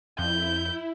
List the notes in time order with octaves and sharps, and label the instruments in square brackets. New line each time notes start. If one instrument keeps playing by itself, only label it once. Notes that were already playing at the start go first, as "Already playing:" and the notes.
[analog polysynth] F2 [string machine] E4 [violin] G6